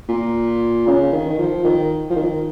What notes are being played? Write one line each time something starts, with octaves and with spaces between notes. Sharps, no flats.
A#2
C#3
D#3
D#3
F3
D#3
F3
D#3